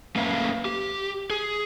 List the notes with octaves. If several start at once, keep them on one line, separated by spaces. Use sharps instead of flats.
A3 A#3 C#4 B4 F5
G4
G#4